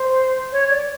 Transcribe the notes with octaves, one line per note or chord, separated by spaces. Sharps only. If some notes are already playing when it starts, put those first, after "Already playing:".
Already playing: C5
C#5
D5